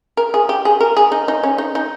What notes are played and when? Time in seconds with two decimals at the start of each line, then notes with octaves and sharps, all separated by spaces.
0.17 A#4
0.34 G#4
0.49 G4
0.65 G#4
0.80 A#4
0.97 G#4
1.12 D#4
1.28 D#4
1.43 C#4
1.58 D#4
1.75 D#4